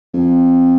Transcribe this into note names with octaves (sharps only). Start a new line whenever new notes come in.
F2